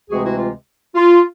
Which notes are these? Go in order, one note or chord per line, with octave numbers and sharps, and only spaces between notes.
D2 C3 E3 G#3 C4 F#4 G#4
E4 F#4
F4
F4